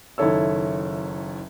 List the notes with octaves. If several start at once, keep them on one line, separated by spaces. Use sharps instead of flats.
F#1 D#3 E4 A4 C#5 E6